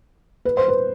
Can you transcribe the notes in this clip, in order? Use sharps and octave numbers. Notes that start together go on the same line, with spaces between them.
B4
C5
B4